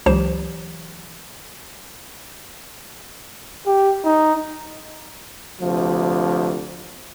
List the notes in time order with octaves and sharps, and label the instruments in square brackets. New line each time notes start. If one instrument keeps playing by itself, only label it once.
[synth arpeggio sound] C#2 C5 E7 [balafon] E3 F#3 G4
[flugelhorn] G4
D#4
[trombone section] D2 C3 F3